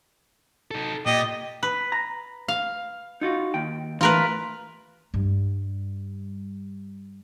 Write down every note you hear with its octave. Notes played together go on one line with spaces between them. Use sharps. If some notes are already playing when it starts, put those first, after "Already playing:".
D#4 A4
A#2 G4 D#5
B4
A#5
F5
D#4 F4 F#4
D#2 G5
E3 A3 F4 A#4 B4
G2 G3